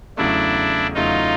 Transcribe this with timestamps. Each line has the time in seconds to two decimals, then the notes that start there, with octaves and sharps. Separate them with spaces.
0.17 E2 C#3 F#3 A3 D4 E4
0.94 E2 C#3 F#3 A3 D#4 F4